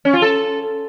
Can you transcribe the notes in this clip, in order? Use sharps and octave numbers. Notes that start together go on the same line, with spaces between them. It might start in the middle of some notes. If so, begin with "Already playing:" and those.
C#4
F4
A4